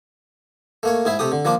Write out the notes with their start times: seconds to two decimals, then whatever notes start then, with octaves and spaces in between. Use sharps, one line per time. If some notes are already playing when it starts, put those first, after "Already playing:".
0.83 A3 A#3 C#5
1.05 G#2 E4 G#4 E5
1.19 C3 A3 G4 D#6
1.32 D3
1.45 D#3 F3 A#3 D4 D6